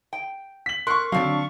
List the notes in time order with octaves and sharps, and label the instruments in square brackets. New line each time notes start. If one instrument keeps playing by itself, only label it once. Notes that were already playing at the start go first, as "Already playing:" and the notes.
[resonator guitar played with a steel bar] G5
[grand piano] B6 F#7
[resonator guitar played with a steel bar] A#4 [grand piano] C6 C#6 [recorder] F#6
[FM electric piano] D3 F#3 [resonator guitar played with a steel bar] C4 D4 [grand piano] F5 [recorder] C#6